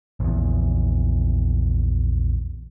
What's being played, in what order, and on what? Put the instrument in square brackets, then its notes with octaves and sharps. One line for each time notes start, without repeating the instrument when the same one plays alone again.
[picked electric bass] A#1 E2